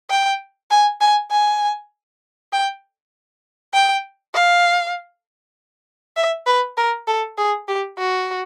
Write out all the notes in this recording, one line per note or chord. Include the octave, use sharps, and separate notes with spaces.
G5
G#5
G#5
G#5
G5
G5
F5
E5
B4
A#4
A4
G#4
G4
F#4